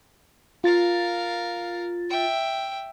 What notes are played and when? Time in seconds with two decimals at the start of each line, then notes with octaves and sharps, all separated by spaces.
0.64 F4 A#4 F5 A6
2.10 E5 G5